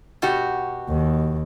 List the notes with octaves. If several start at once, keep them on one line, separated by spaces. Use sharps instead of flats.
B2 F#4 G4
D#2